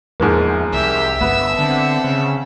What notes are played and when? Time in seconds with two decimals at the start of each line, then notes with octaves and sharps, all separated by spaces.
0.20 E2 G#2 F3 A#3
0.73 C2 G4 E5
1.21 G1 B3 E6
1.59 D3 C4 F#5 A5
2.04 C#3